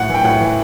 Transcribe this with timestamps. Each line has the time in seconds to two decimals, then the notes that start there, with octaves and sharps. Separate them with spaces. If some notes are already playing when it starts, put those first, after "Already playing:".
Already playing: A2 F#5
0.09 E3
0.14 G5
0.24 A2 F#5
0.40 E3